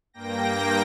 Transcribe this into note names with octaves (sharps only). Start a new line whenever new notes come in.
G2 A#3 G5 A#6